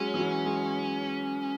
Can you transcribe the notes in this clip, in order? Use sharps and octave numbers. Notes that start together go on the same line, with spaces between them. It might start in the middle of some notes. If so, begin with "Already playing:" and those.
Already playing: F#3 G#3 C#4
E3
F#3
G#3